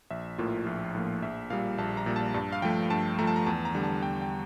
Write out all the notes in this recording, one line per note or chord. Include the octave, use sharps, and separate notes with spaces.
A#1 E5
A2 F3 A#3 F4
A#1 F4
A2 F3 A#3
A#1 E5
A#2 G3 F5
A#1 A5
A#5
A#2 G3
A5
G2 A5
F5
F3 A3 G5
G2 A5
F3 A3 A#5
A5
A#5
E2 A5
A#5
D3 G3
A5
E2 G5
G5